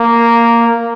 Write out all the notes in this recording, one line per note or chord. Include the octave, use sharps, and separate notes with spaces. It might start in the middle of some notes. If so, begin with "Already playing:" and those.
Already playing: A#3